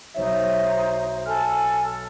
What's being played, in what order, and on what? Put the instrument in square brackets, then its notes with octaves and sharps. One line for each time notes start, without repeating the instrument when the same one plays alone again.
[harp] B1 C#5 E5 [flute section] D#4 C5
[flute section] A4 G#5 [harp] B4 F6